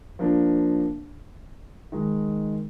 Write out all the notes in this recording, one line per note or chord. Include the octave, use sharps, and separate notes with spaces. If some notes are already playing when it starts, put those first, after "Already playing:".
F3 A#3 D4
D#3 G#3 D#4